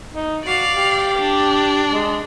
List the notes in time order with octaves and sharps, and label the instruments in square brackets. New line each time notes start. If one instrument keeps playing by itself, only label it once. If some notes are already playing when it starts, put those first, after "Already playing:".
[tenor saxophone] D#4
[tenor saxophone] F#4 [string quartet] D5 F5
[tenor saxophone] G4
[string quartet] D4
[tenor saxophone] G#3